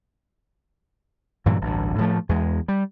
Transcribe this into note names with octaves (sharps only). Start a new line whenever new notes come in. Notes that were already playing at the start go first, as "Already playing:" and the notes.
G2 A#2 E3 F#3
A1 D2 G2
A2 F3 A3
E2 G#3
G3